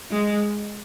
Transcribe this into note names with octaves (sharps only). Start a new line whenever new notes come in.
G#3